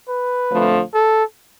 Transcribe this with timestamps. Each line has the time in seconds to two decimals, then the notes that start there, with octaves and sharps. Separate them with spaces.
0.08 B4
0.51 F2 D3 F3 A3
0.94 A4